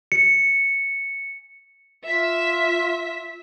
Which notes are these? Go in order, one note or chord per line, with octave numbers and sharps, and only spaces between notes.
C#7
F4 E5 B6